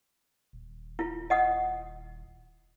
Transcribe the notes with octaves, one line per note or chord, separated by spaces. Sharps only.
D#1
E4 F4
D#5 F#5 D#6